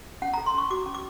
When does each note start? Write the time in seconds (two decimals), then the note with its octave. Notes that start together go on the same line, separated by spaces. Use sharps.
0.22 C#4 F#5
0.33 A4 A#5
0.46 C6
0.54 C#4 C#6
0.70 F#4 D6
0.86 C#4
0.94 D6